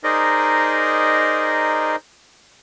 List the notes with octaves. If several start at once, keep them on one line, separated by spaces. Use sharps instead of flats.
D#4 G#4 A#4 C5 D5 D#5